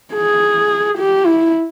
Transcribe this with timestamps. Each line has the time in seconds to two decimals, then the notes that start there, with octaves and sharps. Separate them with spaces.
0.14 G#4
0.98 G4
1.26 E4